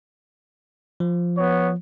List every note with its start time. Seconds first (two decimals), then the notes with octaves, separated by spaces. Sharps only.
1.00 F3
1.38 B3 C#5